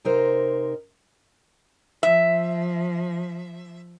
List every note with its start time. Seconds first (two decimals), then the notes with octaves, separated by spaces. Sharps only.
0.05 C3 D#4 A#4 C5
2.03 F3 E5